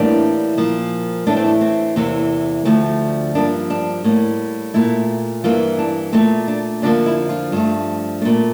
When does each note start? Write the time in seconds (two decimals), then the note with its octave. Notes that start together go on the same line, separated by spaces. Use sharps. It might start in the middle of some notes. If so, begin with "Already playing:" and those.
Already playing: A2 E3 G3 A#3 D4
0.57 A#2 F3 A#3
1.27 A2 E3 A3 D4
1.37 C4
1.46 D4
1.61 C4
1.96 E2 C3 E3 A#3
2.65 D2 D3 F3 A3
3.35 G2 F3 A#3 D4
3.70 D4
4.04 A2 G3 A#3
4.74 A#2 A3 E4
5.44 G2 E3 A#3 F4
5.79 D4
6.13 A#2 A3 C4
6.48 D4
6.82 F2 D3 F3 A#3 D4
7.06 E4
7.29 F4
7.52 G2 F3 A3
8.21 A3 D4
8.25 A#2